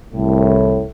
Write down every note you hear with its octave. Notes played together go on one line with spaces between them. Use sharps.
C2 A2